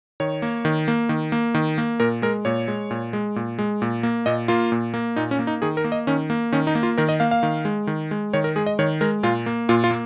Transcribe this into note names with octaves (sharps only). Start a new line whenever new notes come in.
D#3 C#5
A#3
D#3
A#3
D#3
A#3
D#3
A#3
A#2 A#4
G#3 A#4
A#2 C#5
G#3
A#2
G#3
A#2
G#3
A#2
A#3
A#2 D#5
A#3 F4
A#2
A#3
A#2 D#4
C#4
A#3
D#4
D#3 G#4
A#4
A#3
D#5
D#3 C#4
A#3
D#3 C#4
D#4
A#3
F4
D#3 A#4
D#5
A#3 F5
F5
D#3
G#3
D#3
G#3
D#3 C#5
A#4
G#3 G#4
D#5
D#3 C#5
G#3 A#4
A#2 F4
A#3
A#2 F4
F4
A#3